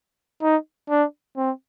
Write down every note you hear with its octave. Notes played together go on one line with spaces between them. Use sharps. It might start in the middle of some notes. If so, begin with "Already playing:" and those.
D#4
D4
C4